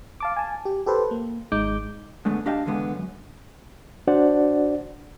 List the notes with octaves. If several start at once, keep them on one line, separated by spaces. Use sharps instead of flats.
F5 A5 D6
G#5 A5
G4
G4 A4 B4 C5
A#3
G#1 G#3 D#4 D6 G6
D3 G#3 A3 B3
D4 G4 D#5 F5 G5 A5
D3 E3 G#3 B3
F#2
D4 F#4 C5 D5 F#5